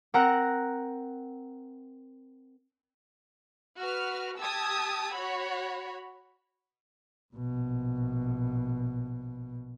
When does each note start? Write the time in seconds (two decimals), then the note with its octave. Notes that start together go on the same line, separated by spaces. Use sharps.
0.14 C4 A#4 F#5 A#5 F#6 A#6
3.79 F#4 B4 F6
4.41 G4 A5 D#6 E6 G#6
5.14 F#4 C#5 B5
7.34 A#1 B2